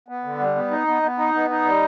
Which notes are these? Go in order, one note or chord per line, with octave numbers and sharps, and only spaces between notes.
B3
D3
G3
B3
D#4
B3
B3
D#4
B3
D#4
G3